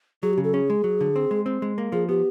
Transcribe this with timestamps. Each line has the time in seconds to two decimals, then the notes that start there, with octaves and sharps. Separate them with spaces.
0.23 F#3 G#4
0.33 G4
0.38 C#3
0.44 A4
0.53 C#4 G#4
0.70 G#3
0.84 F#3
1.01 D3
1.16 C4
1.31 G#3
1.46 C4
1.62 G#3
1.78 A#3
1.92 F3 G#4
2.09 B3 G4